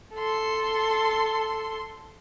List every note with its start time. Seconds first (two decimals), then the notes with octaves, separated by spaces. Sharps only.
0.15 A4 C6